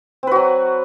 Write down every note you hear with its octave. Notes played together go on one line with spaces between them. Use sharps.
F#3 C4 F#4 B4